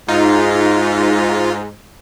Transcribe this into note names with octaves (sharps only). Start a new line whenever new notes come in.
G#2 D#4 F4